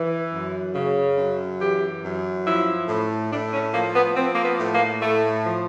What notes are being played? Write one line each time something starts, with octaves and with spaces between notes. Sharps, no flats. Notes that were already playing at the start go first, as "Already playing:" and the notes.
Already playing: E3
F#2
C#3
F#2
E3 G4
F#2
F3 E4
A2
A2 D4
C#4
F3 A#3
B3
F3 C4
A#3
B3
A2
A#3
A2 A3
F3